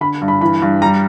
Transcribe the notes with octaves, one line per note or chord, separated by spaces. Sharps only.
D3 B5
G2
B5
E3 B5
G2
G3 A#5